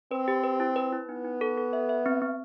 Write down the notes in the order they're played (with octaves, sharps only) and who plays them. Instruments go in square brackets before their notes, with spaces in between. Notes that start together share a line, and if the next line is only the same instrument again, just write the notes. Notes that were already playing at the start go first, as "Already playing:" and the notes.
[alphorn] C4 [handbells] B4
[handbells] G4
B4
E4
B4
E4
[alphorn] B3 [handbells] D#4
[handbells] D#4
A4
A4
E5
E5
C4
C4